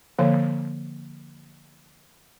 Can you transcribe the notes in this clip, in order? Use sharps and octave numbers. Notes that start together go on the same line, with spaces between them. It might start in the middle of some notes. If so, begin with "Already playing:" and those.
D3 F3 A#3 C#5